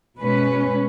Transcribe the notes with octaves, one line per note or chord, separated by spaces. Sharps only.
B2 G#3 C#4 B4